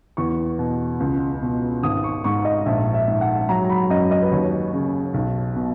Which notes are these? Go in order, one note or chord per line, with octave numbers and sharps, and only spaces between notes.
E2 C#6
B2
C#2
B2
G#1 D#6
C#6
G#2 C#6
D#5
A#1 E5
E5
G#2
F#5
F#3 A#5
A#5
B5
F#2 D#5
D#5
B4
D#2 C#5
C#3
B1
B2